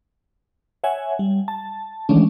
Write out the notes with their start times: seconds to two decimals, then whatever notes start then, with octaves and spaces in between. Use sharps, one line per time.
0.84 C#5 E5 F#5 G#5
1.19 G3
1.48 A5
2.09 D#3 E3 G#3 A3 C#4 D4